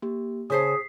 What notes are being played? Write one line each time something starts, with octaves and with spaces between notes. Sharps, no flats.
A#3 G4
C#3 G#4 C5 A5 D#6 B6 C7